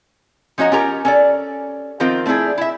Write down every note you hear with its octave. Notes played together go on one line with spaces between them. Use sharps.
F3 C#4 F#4 D#5 A#5
C#4 F4 G4 A#4 A#5
C#4 A4 D5
D#3 F3 C4 F4 A#4 C5
A3 C4 D4 E4 G#4
E4 E5